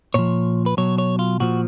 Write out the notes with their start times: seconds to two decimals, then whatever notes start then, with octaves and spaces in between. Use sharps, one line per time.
0.14 A#2 F3 C#5
0.66 B4
0.77 B2 F#3 C#5
0.98 C#5
1.19 F4
1.40 A#2 F3 F#4